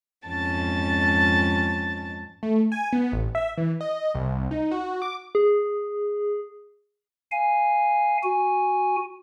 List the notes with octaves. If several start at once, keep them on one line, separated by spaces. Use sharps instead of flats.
F2 G#2 C#4 A5 A6
A3
G#5
B3
A1
E5
E3
D#5
C2
D#4
F#4
D6
G#4
F5 G#5
F#4 G#5